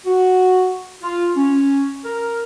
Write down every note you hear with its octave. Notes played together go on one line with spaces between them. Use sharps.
F#4
F4
C#4
A#4